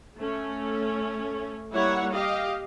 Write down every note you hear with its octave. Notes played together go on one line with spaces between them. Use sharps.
A3 C#4
G3 A#3 E4 C#5 F#5
G4 D#5 F5